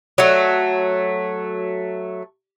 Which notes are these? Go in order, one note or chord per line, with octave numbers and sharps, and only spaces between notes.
F#3 A3